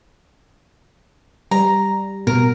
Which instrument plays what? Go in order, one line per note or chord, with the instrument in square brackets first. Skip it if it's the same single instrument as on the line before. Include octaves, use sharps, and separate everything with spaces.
[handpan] G3 [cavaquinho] A#5
[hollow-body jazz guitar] B2 [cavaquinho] A#4